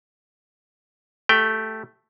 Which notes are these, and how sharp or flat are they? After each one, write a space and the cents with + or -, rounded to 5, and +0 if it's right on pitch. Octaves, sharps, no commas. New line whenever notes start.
A3 +0 G4 +0 G5 +0